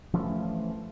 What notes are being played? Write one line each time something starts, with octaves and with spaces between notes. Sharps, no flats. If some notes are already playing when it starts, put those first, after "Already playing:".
E3 F3 A3 C#4